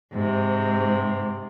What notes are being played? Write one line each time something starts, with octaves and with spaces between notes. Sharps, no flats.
G#2 C3